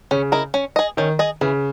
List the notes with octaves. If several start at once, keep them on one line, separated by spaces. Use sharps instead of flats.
C#3 C#4
E4 A#4 D#5
C#4
G#4 D#5
D#3 C#4
G#4 D#5
C#3 E3